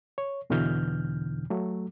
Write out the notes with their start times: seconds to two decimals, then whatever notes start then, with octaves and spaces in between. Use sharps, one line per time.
0.18 C#5
0.50 E2 B2 D3 E3 F6 G6
1.50 F#3 A3